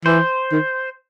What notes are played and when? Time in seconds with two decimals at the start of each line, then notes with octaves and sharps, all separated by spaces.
0.05 E3 C5
0.52 D#3